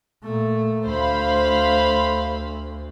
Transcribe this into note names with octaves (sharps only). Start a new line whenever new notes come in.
A#2 A3
D2 C5 F5 B5